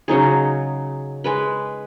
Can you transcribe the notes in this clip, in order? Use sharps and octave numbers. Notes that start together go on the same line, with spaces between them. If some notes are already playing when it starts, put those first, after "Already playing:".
C#3 F#3 D#4 G#4
G#3 B4 B5